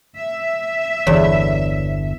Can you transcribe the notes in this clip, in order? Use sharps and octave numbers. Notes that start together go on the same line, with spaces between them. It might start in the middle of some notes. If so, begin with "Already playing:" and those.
E5
G1 E2 D3 C#5 D5